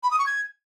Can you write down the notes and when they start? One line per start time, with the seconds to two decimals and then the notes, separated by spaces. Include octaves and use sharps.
0.03 B5
0.11 D#6
0.19 C#6
0.26 G#6